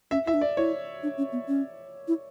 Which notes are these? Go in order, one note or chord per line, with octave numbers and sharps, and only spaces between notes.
C#4 E5
E4 E5
D4
D5
E4 C#5
D4
C#4
B3
C#4
E4